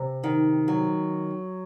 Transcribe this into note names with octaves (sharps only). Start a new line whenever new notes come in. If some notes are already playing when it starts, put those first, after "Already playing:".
Already playing: C3
D#3
F#3